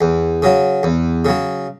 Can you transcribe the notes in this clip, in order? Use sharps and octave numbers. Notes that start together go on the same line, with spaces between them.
E2
C#3 F#3
E2
C#3 F#3